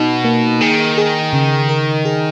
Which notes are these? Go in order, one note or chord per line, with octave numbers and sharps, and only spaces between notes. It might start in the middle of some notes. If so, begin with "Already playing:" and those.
Already playing: B2 D#4
A#3
D#3 G#4
G#4
C#3
A#4
G#4